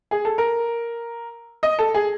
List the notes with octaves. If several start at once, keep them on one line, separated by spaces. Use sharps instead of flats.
G#4
A4
A#4
D#5
A4
G#4